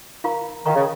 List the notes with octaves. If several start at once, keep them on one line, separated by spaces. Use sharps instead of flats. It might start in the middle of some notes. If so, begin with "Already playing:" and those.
F4 A#4 F5 A#5 C#6
D#3 F4 A#4 F5 A#5 C#6
C#3